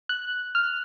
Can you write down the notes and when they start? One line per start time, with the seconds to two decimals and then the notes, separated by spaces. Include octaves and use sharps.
0.09 F#6
0.55 F6